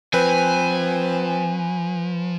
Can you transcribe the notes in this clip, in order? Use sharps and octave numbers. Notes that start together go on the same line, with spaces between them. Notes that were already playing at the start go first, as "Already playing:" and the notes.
F3 C4 B4 G#5